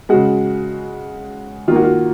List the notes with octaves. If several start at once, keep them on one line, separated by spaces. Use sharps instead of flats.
C#3 G#3 F#4
D#3 A#3 F4 F#4
F4